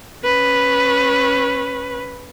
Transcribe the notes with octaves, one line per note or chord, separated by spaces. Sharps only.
C#4 B4